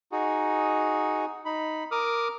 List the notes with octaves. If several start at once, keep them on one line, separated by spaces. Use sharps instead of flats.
D#4 F#4 G#4
D#4 B5
A#4 D6 D#6 F6